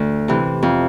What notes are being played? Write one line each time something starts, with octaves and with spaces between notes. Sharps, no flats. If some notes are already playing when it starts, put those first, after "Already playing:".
Already playing: D2
C3 E3
F2